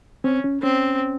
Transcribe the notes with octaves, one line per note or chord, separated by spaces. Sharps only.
C4 C#4
C#4
C4 C#4